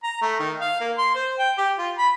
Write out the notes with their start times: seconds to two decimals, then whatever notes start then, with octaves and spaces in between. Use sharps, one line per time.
0.04 A#5
0.21 A3
0.40 D#3
0.61 F5
0.81 A#3
0.98 C6
1.15 C5
1.39 G5
1.57 G4
1.78 F4
1.98 B5